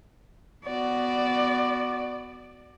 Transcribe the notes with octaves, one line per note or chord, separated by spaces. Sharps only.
B3 F#4 D5